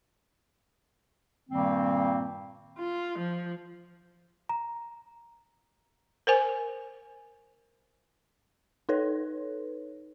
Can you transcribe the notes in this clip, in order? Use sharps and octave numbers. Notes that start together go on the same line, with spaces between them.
G2 A#2 D#3 G3 A#3 C4
F4
F3
A#5
A#4 C5 G#5
D#4 A4 B4 C#5